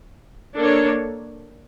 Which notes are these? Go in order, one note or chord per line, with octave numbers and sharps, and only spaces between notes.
A#3 D4 A4 C#5